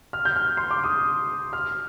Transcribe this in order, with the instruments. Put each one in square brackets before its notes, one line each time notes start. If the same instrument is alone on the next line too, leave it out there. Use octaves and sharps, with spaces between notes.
[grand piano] F6
G6
F6
C6
D6
D#6
F6